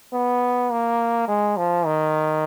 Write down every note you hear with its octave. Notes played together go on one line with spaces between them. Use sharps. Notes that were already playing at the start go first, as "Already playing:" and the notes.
B3
A#3
G#3
F3
D#3